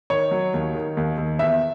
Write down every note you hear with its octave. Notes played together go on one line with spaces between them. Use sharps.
D#3 C#5
F#3
D#2
D#3
D#2
D#2
E2 E5